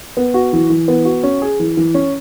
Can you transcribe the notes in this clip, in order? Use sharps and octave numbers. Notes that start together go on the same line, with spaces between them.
B3
F#4
E3
E3
B3
F#4
C#4
G#4
E3
E3
C#4